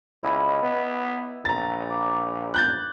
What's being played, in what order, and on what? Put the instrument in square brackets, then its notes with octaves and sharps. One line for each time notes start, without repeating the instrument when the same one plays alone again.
[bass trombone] C#2 [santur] E4 D#5 B5
[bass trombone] B3
[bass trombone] A#1 [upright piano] A#5 A6
[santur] D5
[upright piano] F#6 G6 A6